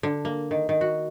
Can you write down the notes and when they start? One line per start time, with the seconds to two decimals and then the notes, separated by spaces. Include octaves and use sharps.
0.03 D3
0.25 A#3
0.51 D#3
0.69 D#3
0.81 F#4